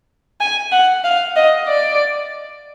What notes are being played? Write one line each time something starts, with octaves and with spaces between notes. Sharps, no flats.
G#5
F#5
F5
D#5
D5